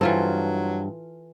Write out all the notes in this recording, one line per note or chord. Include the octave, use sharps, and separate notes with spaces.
G2 E3 F#3 F4 A4 C5